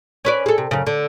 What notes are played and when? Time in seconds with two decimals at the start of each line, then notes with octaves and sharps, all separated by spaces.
0.25 C#4 B4 D5
0.46 G#4 A4
0.58 C3
0.71 F#2 C#3
0.87 D3